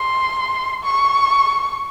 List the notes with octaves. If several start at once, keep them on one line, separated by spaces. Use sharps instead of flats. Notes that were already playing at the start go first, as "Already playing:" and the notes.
Already playing: C6
C#6